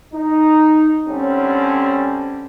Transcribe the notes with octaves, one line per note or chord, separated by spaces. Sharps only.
D#4
D3 G3 C4 C#4